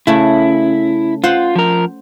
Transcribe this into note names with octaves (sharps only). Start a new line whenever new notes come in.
C#3 A3 E4
F4 C5 F#5
F3 A#4